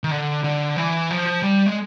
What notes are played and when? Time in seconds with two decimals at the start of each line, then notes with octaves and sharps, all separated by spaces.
0.04 D#3
0.11 D3
0.44 D3
0.76 E3
1.10 F3
1.42 G3
1.66 G#3